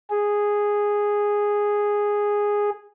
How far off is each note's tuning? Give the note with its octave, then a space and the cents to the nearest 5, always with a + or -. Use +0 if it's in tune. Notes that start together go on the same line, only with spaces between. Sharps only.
G#4 -5